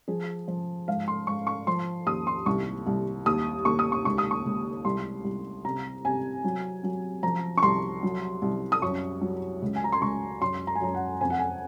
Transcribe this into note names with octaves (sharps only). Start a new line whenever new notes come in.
F3 G#4
F3
G#2 F5
C6
G#2 C#6
C#6
F3 C6
D#2 D#6
C6
C2 C#6
C2
D#2 D#6
D#2 C#6
D#6
C#6
C#2 C#6
D#6
C#6
C#2
C2 C6
C2
C3 A#5
C3 G#5
F#3
F#3
F3 A#5
C#6
C2 C6
F#3
C2
D#6
F#2 C#6
F#3
C#2
G#5
A#5
C6
C#2 C#6
F#2 C6
A#5
G#5
F#2 A#5
F#5
F2 G#5
F#5
G#5